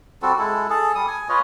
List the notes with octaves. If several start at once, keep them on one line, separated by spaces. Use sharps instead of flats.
G3 C4 F#4 A4
G#3 E4 A4
G#4 A4
G3 D#6
G#5
F4 B4 C#5 D#5